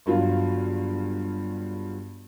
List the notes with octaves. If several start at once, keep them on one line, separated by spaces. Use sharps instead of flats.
G1 G2 F#3 F4